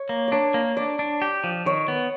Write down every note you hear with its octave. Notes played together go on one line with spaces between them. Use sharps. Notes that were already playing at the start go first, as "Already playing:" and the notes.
Already playing: C#5
A#3
D4 C#5 D5
A#3
D4 D5
D4
G4
F3
D#3 C#5
B3